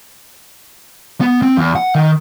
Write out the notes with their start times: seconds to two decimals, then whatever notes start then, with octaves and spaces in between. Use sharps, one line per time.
1.21 B3
1.42 C4
1.57 E2
1.75 F#5
1.95 D#3